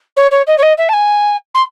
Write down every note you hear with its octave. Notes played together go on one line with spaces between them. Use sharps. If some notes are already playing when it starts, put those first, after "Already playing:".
C#5
C#5
D#5
C#5
D#5
E5
A5
G#5
C6